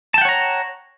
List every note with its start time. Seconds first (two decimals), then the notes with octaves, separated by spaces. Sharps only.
0.14 A5
0.18 G5
0.21 F#5
0.25 C#5
0.29 A#5